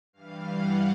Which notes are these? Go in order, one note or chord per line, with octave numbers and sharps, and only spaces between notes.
G2 E3 G3 F5
F#5